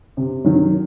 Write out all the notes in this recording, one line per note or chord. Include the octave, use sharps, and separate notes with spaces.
C3
D#3 F#3